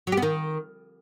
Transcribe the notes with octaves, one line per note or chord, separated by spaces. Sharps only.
F#3
G4
B3
D#3